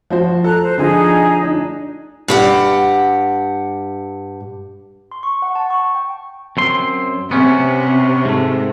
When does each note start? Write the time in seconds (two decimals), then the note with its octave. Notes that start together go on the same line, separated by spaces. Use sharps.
0.10 F3 F#4 C5
0.44 A4 A#5 F#6
0.62 C5
0.78 D3 F3 D#4 G#4
1.43 D4 D#4
2.28 G2 G4 F#5
5.12 C6
5.23 C#6
5.42 F#5
5.55 A5
5.70 C#6
5.95 G5
6.57 F#2 C4 C6
7.31 C3 B3 C#4
8.25 G#2 A3